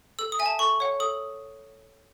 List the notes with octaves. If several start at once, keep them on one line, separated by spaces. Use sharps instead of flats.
A4 E6
D#6
E5 G#5
A5
A4 C#6
C#5 F#5
A4 D#6